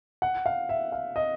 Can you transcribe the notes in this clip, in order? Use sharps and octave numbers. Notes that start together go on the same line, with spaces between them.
F#5
F5
E5
F5
D#5